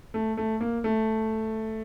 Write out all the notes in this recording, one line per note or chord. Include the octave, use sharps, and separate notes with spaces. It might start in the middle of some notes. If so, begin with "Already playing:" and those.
A3
A3
A#3
A3